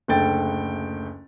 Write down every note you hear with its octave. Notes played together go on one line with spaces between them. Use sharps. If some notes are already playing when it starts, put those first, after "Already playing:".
F#1 D2 A4 G5 A6